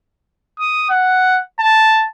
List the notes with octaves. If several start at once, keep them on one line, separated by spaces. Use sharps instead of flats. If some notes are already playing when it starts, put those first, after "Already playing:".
D#6
F#5
A5